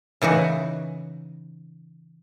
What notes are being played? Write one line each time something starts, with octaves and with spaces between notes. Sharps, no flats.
C#3 E3 D#4 F#4